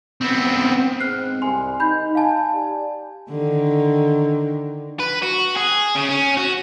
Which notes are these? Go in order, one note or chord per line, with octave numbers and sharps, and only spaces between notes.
B3 C4
G#2 C4 F6 F#6 C7
C2 G#5 C6
D#4 B5 G6
F5 G#5 A5
G4 D5
D3 D#3
B4
F#4
G#4
C#3
C#4
F#4